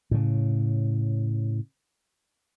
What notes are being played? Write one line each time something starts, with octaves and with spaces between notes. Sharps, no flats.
A2 C#3